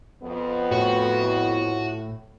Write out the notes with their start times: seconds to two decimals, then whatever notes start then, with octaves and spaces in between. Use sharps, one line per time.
0.23 F2 B3
0.72 A2 F#4